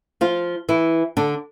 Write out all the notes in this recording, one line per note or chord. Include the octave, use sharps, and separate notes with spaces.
F3 F4
E3 E4
D3 D4